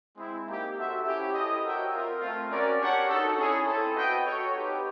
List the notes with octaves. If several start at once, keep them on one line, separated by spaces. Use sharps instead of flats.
G#3 C4 E4
A#3 D#4 G4
F#4 A4 C5 E5
C#4 E4 G4
E4 A4 C5 D#5
F#4 A#4 C#5 E5 G5
C4 F4 A#4
A3 C4 F4
C#4 F#4 A#4 D5
D4 G4 A#4 C#5 F#5
D#4 F#4 A4
C#4 E4 G#4 C#5
C4 E4 A4
F#4 B4 D#5 G5
F#4 A4 C#5
C4 D#4 G4 B4